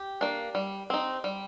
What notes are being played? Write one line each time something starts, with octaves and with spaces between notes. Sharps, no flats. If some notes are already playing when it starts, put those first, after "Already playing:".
Already playing: G4
A#3 D4
G3
C4 D#4
G3